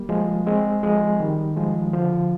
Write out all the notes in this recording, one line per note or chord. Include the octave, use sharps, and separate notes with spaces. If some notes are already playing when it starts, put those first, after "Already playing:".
Already playing: G3 A#3
F3 G#3
G#3 C4
F3 G#3
D#3 G3
F3 G#3
D3 F3